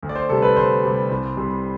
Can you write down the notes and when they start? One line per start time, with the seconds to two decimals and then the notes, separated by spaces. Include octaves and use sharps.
0.03 D2
0.09 D5
0.16 C5
0.29 C3 G3 A4
0.42 B4
0.56 D2 C5
0.83 C3 G3
1.10 C2
1.37 C3 G3